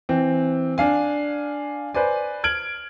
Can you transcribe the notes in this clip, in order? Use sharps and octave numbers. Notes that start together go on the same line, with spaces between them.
E3 C4
D4 F5 G#5
B4 C5 D5 G#5
F6 G#6 D7 F#7